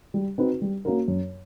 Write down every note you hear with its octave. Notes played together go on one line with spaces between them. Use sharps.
G3
C4 D#4 F#4 B4
G3
A#3 C#4 F#4 A#4
F#2